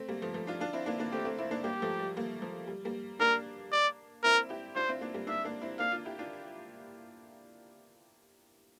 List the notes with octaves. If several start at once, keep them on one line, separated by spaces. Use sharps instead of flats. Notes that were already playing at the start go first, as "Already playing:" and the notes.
Already playing: A3 C4
G3 A#3
F3 A3
F3 A3
D4 F4
D4 F4
C4 E4
A#3 D4
A#3 D4
A3 C4 G4
A3 C4
C4 E4
A#3 D4
G3 A#3 G4
F3 A3
G3
G3 A#3
F3
G3
G3 A#3
A#3 D4 A#4
D5
C4 E4 A#4
E4 G4
D4 F4 C5
C4 E4
A#3 D4
G3 A#3
A#3 D4 E5
A#3 D4
C4 E4
A#3 D4 F5
D4 F4
E4 G4
D4 F4